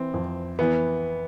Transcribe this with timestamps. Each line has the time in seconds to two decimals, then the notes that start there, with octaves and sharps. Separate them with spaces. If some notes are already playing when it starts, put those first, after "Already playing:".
Already playing: E3 C4
0.14 F2
0.59 E3 B3